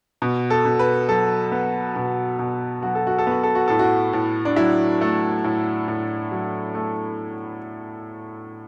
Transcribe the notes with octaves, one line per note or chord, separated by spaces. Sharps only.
B2
A4
B2
B4
F#3 A4
B3
B2
B2
F#3 F#4
A4
F#4
A4
B3 F#4
A4
F#4
A2 A4
F#4
A2
D4
F#3 E4
A3
A2
A2
F#3
A3